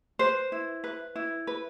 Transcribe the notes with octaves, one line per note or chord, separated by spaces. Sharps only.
B4 C5
E4
B4
E4
B4